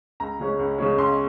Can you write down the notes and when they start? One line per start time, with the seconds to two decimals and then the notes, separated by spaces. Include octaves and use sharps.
0.20 C#2 A#5
0.40 C#3 G#3 C#4
0.59 C#2
0.78 C#3 G#3 C#4
0.98 C#2 C6